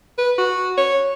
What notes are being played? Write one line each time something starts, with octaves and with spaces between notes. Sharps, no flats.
B4
F#4
C#5